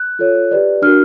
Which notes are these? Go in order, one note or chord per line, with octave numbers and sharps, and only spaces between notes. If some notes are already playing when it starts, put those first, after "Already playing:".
Already playing: F#6
F4 A4 C#5
G4 B4 D5
D4 F#4 A#4 F6